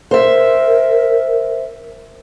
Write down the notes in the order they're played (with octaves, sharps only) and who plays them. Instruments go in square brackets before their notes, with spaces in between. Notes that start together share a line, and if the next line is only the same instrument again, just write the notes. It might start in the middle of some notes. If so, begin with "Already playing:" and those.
[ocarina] A#4 [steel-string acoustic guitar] C5 E5